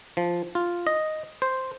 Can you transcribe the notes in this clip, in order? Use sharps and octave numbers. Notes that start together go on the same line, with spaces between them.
F3
F4
D#5
C5